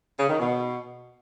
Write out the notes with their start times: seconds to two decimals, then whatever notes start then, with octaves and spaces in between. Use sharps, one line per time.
0.20 C#3
0.30 D#3
0.40 B2